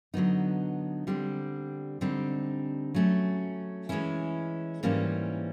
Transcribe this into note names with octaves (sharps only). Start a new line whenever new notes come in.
D3 F#3 B3 D#4
D3 G3 C4
D3 G3 C4 D#4
F#3 A3 C#4
E3 G#3 C#4 E4
G#2 E3 G3 A#3 C#4